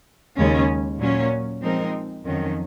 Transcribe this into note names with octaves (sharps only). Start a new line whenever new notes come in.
D#2 C#3 G#3 C#4
A#2 F#3 C#4
F3 G#3 C4 D#4 A#4
F2 D#3 F#3 C#4